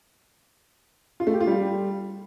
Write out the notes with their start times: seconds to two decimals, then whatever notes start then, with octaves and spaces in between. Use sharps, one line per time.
1.20 F4
1.27 A3
1.34 G4
1.40 F4
1.47 G3